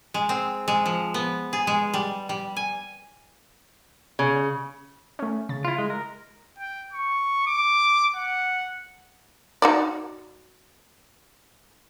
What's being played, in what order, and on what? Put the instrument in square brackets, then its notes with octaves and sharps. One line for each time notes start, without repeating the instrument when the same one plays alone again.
[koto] G#3
C4
G#3
F3
B3
G#4
G#3
G3
G3
G#5
[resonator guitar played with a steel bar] C#3
[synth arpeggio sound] A3 C#4
C#3 A6
[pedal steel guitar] E4 F4
G#3
A#4
[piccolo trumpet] G5
C#6
D6
F#5
[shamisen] D#4 F#4 D5